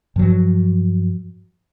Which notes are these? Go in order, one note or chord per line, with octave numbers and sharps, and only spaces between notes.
G2 F3 F#3